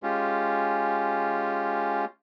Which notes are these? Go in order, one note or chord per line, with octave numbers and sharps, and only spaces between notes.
G#3 C#4 F4 G4